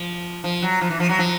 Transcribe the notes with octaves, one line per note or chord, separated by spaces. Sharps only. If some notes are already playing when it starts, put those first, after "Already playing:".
Already playing: F3
F3
F#3
F3
E3
F3
F#3
F3